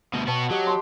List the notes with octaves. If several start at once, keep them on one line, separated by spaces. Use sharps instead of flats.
D2 B2
B2 B3 F#4 C#5 G5 A5
F#3 F#4 G4 D#5
A5 C6